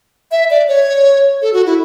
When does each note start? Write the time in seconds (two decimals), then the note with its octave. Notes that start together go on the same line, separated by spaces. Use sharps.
0.31 E5
0.50 D5
0.68 C#5
1.42 A4
1.53 F#4
1.66 E4